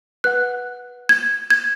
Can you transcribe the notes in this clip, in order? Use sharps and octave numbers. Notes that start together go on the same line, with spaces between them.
B4 F#5 F#6
G#6
G#6